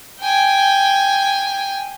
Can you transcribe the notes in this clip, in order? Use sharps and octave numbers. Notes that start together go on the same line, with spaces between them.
G5 G#5